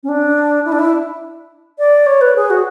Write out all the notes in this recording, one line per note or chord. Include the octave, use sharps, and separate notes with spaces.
C#4
D4
E4
D4
E4
D5
C#5
B4
G#4
F#4